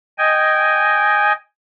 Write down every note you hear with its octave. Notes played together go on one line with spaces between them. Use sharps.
D#5 G5 G#5